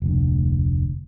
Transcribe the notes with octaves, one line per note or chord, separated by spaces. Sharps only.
F1 D2